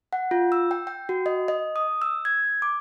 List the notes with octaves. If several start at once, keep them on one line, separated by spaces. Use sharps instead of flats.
F#5
F4
E6
G5
G5
F#4
D#5
D#5
D#6
E6
G#6
D6